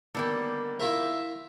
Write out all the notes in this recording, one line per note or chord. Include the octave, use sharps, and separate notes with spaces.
D3 D#3 G3 A#3 B3
E4 F4 A#4 E5